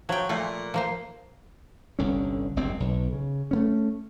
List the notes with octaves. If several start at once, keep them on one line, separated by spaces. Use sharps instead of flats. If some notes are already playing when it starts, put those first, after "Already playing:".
F3 F#3 G5
A#2 A3 F4
F3 A#3 C5
G1 C2 D3 C#4
F#1 C#2 G2 C4
B1
C#3
A3 B3 C#4